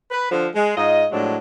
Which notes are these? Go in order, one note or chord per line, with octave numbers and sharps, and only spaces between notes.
B4
D3 F3
G#3
G#2 F4 D#5
A2 F3 F#3 G#3 D4